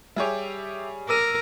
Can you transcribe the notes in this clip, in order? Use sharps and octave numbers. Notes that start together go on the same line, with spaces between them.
G3 G4 G#4 C#5 E5
A#4 D6 E6 D#7